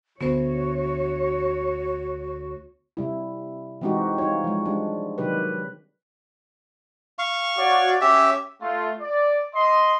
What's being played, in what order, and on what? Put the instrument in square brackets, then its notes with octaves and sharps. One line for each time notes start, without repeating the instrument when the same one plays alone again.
[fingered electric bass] D2 D3 [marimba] B3 C5 [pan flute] F#4 [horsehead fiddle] C#5
[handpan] C3 G3 E4
E3 G#3 C4 D#4 F#4 G4
G3 D#4 F4 C#5
F3 G#3
G3 G#3 D4
C3 D#3 F#3 G4 B4
[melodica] F5 C#6
[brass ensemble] F#4 C#5 D5
[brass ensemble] C#4 [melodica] G4 E5
[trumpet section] A3 F4
D5
D#5 C6